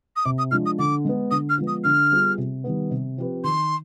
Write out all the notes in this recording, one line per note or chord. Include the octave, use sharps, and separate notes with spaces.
D#6
C3 D6
D#6
F3 G#3 D4 F6
D#6
D3 D6
G#3 B3
D3 D#6
F6
F3 G#3 B3
D#6
D3 F6
G3 B3 F4 G#4
C3
D#3 G3 B3
C3
F3 C4 G4 B4
D#3 C6